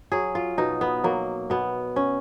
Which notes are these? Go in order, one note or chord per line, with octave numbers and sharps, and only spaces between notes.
F#3 G#4
F4
B2 D#4
B3
F#3 A#3
B2 B3
C#4